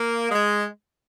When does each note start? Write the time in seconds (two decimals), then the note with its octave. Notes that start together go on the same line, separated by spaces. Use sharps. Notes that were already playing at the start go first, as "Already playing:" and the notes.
Already playing: A#3
0.31 G#3